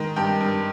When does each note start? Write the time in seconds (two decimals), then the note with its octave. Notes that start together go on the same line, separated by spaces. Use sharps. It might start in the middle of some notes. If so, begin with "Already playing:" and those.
Already playing: D#3 G#3 A#5
0.16 G2 G5
0.40 G2